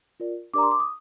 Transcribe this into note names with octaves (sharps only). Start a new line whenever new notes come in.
F4 A#4 D5
D4 G4 A#4 D5 A#5 D6
C6
D6
D#6